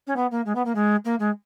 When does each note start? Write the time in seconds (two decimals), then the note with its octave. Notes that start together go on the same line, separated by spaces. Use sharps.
0.07 C#4
0.16 B3
0.31 A#3
0.46 G#3
0.55 B3
0.65 A#3
0.75 G#3
1.05 A#3
1.20 G#3